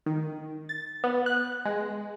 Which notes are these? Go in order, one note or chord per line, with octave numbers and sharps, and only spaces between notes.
D#3
A6
B3
F#6
G#3